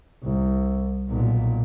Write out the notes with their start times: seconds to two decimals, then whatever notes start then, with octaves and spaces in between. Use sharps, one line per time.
0.24 C2
1.09 B1 A#2